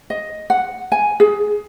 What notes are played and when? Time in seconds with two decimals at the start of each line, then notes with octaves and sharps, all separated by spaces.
0.10 D#5
0.50 F#5
0.92 G#5
1.20 G#4